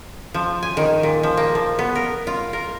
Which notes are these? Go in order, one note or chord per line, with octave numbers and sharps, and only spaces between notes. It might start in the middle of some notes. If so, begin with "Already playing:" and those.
F3
G#5
D#3
A#2
F3
A#3
F3
B3
A#4
F4
A#4